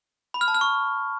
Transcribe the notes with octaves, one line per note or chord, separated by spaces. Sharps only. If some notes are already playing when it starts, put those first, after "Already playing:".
B5
F6
A5
F6
C#6